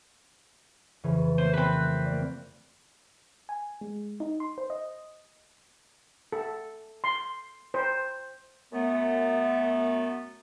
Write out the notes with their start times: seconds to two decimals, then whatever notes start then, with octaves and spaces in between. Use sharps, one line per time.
1.04 F2 C#3 E3
1.38 A3 A#3 C5
1.54 C4 B4
2.06 A#3 D5
3.49 G#5
3.81 G#3
4.20 D#4
4.40 C6
4.58 C5
4.70 D#5
6.32 A4
7.04 C6
7.74 C5
8.73 F#2 A3 B3